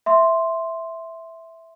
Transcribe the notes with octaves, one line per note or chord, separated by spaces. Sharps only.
E5 C6